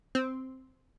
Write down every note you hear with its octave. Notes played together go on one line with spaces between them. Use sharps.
C4